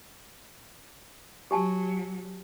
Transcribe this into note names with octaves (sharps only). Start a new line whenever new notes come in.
F#3 G4 G#5 A5